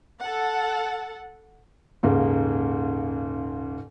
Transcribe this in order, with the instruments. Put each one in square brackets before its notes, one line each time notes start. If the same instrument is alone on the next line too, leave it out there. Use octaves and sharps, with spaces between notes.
[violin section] A4 F#5
[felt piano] D#1 G#2 C#3 A#3